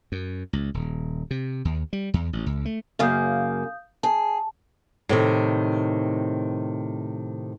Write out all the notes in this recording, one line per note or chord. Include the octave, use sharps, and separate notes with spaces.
F#2
C#2
D#1
C3
D#2
G3
E2
A1
C#2
A3
F#2 C#3 A#3 F5 D#6 G6
G#4 A5
A2 C3 D#3